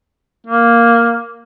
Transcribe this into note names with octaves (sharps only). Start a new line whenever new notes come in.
A#3